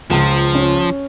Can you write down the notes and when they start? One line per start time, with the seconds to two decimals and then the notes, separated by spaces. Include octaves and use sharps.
0.10 C#2 F3
0.55 C#4